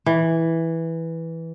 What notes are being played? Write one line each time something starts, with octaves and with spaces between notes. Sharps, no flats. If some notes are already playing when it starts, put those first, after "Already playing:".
E3